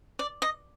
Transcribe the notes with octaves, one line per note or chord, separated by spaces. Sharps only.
D5
D#5